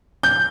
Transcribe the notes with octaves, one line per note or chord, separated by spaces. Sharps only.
G6